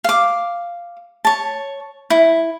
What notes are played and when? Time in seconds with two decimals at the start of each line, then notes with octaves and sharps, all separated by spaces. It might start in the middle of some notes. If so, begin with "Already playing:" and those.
0.04 F5 D6
1.25 C#5 A5
2.10 E4